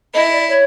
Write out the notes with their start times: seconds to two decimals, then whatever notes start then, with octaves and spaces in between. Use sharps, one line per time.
0.14 E4 D#5
0.32 D5
0.48 C#5